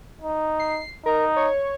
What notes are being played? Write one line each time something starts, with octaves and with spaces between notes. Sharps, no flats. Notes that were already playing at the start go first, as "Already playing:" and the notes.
D#4
C7
D#4 A#4
C#5